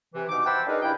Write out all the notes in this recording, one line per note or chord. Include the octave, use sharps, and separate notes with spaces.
C3 E3
G2 B2 D#4 D6
C5 E5 F#5 G5 A5 B5
D4 D#4 G#4 A#4 B4 D#5
G2 C#3 D4 E4 G5